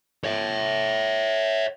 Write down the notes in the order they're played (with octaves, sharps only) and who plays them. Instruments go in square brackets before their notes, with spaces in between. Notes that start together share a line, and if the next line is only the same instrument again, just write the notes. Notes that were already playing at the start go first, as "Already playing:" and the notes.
[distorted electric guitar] C#5 E5